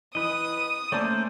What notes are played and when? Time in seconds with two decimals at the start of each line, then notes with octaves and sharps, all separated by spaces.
0.15 E3 B4 D#5 D#6
0.92 A3 A#3 C#4 C5 D5 A5